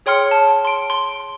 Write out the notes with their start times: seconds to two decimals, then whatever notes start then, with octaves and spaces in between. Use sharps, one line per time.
0.06 G#4 C#5 G5 C6 F6 C#7
0.31 A5
0.65 C6 D7
0.90 C6